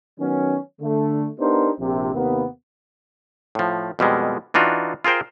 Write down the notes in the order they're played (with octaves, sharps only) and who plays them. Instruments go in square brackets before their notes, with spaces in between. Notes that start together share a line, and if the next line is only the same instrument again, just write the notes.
[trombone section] D#3 F#3 B3 C#4
D3 A3
B3 D4 D#4 G4 A#4 C5
A#1 C3
D#2 C3 A#3 B3
[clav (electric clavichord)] A2 F3
F2 B2 G3 G#3
E3 D4 D#4 F4 F#4
F4 G#4 A#4 C5 G5